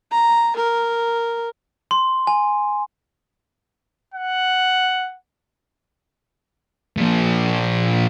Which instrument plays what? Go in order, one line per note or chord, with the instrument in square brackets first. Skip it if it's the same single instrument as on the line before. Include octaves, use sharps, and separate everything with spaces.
[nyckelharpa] A#5
A#4
[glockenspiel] C6
G#5
[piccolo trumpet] F#5
[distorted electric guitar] A#2 F3